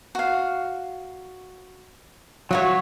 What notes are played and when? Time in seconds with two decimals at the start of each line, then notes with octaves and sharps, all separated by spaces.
0.15 F#4 F5
2.51 F#3 F4 F#4 C#5 E5